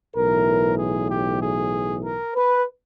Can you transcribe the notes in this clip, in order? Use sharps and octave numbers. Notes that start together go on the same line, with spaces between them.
B1 A2 E3 A#4
G#4
G4
G#4
A#4
B4